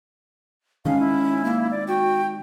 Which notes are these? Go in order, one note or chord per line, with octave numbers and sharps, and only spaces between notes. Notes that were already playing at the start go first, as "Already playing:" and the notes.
D#3 G#3 C#4 F5
E4
A#3
D5
F#4 G5